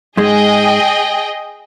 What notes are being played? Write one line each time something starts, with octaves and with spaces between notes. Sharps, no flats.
G#2 G#3 G#4 D#5 G5